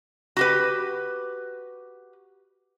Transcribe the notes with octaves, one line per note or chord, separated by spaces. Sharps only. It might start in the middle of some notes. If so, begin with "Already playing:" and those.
F#4 G4 B4